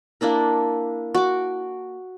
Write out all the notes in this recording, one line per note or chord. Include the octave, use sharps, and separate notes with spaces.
A#3 D4 E4 A#4
F#4 D6